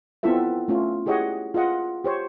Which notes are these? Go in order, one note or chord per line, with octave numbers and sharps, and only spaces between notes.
B3 C4 E4 F4 A4 E5
A3 C#4 F4
E4 G4 G#4 C#5 D#5 F#5
F4 G#4 D#5 F#5
G4 C5 C#5